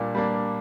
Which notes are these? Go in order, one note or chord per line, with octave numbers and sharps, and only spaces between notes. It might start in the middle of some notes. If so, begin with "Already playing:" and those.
Already playing: A#2 G3 A#3 D4
G3 A#3 D4